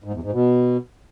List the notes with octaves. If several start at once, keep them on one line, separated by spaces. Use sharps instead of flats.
G#2
E2
G#2
B2